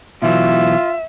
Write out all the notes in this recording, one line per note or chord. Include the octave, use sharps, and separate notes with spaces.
B2 E3 F#3 F4 E5